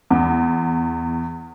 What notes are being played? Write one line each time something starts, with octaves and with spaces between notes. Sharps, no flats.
E2